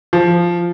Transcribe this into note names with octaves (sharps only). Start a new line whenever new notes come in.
F3